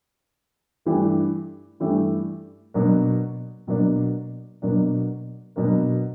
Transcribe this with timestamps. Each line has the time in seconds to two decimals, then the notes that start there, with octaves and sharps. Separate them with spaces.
0.86 G2 E3 A3 D4 G4
1.80 G2 E3 A3 D4 G4
2.74 B2 F#3 A#3 D4
3.67 B2 F#3 A#3 D4
4.62 B2 F#3 A#3 D4
5.56 B2 F#3 A#3 D4